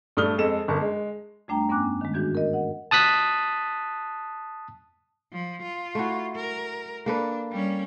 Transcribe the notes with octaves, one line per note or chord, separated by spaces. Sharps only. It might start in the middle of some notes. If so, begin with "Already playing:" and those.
G2 A3 D5 D#6 F6 G7
F2 G#3 A4 E7
G1 A#4 A5
G#3
F2 G3 A3 D4 G5 A#5
G2 B3 C#4 G#5 D6 F#6
D#3 G#3
G#2 E3 D4 F#4 G6 G#6
A#4 D#5
D#5 F#5
A5 D#6 F#6 B6
F3
F4
A3 E4 F#4
A#4
A#3 D4 A4 B4
G3 C#4